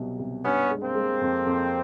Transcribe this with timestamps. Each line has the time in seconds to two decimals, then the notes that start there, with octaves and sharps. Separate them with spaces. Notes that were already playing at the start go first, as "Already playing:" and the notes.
Already playing: C2 B2 F#3
0.19 C2
0.44 G2 B3 C#4
0.71 G#3
0.83 A#3 C4
0.95 G#3
1.21 F2
1.47 F2